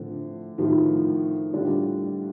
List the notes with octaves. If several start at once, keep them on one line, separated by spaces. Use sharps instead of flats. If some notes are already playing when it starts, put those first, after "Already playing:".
Already playing: A2 D3 F3 C4
A2 D#3 F3 C4
A2 D3 G3 D4 F4